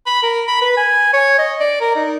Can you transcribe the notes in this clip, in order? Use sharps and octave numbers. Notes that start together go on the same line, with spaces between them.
B5
A#4
B5
B4
G#5
C#5
D#5
D5
A#4
D#4